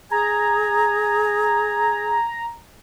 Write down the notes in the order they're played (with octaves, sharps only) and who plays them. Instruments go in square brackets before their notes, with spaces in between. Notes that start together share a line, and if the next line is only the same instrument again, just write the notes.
[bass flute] G#4 [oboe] G#5 [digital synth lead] A#5